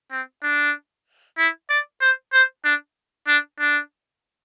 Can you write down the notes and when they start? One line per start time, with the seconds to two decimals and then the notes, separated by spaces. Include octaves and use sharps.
0.11 C4
0.43 D4
1.38 E4
1.70 D5
2.01 C5
2.33 C5
2.65 D4
3.28 D4
3.60 D4